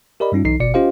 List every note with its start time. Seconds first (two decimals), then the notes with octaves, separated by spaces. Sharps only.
0.20 G4 A#4 D5 D#5 B5
0.32 G2 G3 C#4 D#4 F4
0.45 B1 E3 D#4 C7
0.60 G1 B2 D5 C#7
0.74 C#4 F4 G4 C5 D#5 F5